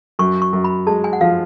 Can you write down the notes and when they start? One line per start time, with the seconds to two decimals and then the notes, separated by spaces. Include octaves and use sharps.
0.19 F#2 C#6
0.42 C#6
0.53 F#2
0.64 B5
0.87 G#3 A5
1.04 G#5
1.13 F#5
1.21 F3 F5